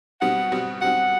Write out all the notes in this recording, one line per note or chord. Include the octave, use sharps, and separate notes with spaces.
B2 G3 C4 F#4 F#5
B2 G3 C4 F#4
B2 G3 C4 F#4 F#5